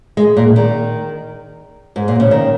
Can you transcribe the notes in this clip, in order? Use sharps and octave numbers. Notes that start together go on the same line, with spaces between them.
G#3
A#2
D#3
G#2
A#2
C#3
D#3